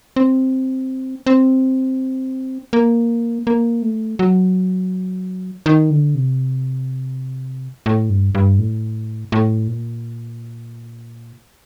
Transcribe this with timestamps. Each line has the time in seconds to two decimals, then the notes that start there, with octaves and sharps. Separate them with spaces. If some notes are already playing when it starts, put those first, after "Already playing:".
0.16 C4
1.26 C4
2.73 A#3
3.47 A#3
3.82 A3
4.19 F#3
5.66 D#3
5.90 D3
6.15 C3
7.86 A2
8.10 G2
8.35 G2
8.59 A2
9.32 A2
9.68 A#2